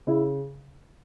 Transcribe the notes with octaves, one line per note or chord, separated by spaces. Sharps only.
C#3 E4